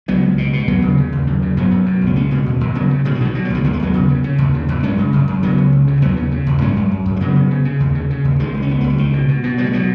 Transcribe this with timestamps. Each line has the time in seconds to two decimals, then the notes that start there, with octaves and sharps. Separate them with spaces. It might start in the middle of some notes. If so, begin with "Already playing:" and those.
0.08 C#2 F#3 B3
0.23 C#2
0.38 B2
0.53 B2
0.67 D#2 F#3 B3
0.82 C#3
0.97 C#3
1.12 D#2
1.27 F#2
1.42 C#3
1.57 F#2 F#3 B3
1.71 F#2
1.86 B2
2.01 C#2
2.07 B3
2.16 C#2 G#3 C#4
2.31 B2
2.46 D#2
2.61 D#2
2.75 C#3 F#3 B3
2.90 C#3
3.05 B2 D#3 G#3
3.15 F#3
3.21 B2 D#3
3.35 B2 F#3
3.45 F#3
3.50 C#2 D#3 G#3
3.64 D#2 B3
3.73 G#3
3.80 D#2 F#3 B3
3.94 C#3
4.09 C#3
4.24 C#3
4.38 D#2
4.54 C#3
4.69 D#2
4.83 F#2 G#3 C#4
4.98 C#3
5.13 F#2
5.28 F#2
5.43 C#3 F#3 B3
5.58 C#2
5.73 C#2
5.87 C#3
6.02 D#2 F#3 B3
6.17 C#3
6.31 C#3
6.46 D#2
6.61 F#2 G#3 C#4
6.76 F#2
6.91 F#2
7.06 F#2
7.16 G#3
7.21 C#3 F#3 B3
7.36 C#3
7.51 C#3
7.65 C#3
7.80 D#2
7.95 C#3
8.10 C#3
8.25 D#2
8.39 C#2 D#3 G#3
8.54 C#2
8.62 C#4
8.69 C#2 B3
8.81 C#2 G#3
8.90 F#3
8.98 C#2 D#3
9.13 B2
9.28 B2
9.44 B2
9.58 B2 F#3
9.66 G#3
9.73 B2 F#3